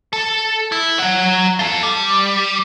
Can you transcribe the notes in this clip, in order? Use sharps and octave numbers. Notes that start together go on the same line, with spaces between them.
A4
E4
F#3 F#5
F4 A4
G3